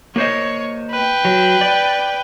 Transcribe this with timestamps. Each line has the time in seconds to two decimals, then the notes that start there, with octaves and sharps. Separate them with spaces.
0.16 A#3 C5 C#5 D#5
0.91 B4 G5
1.25 F#3
1.61 D5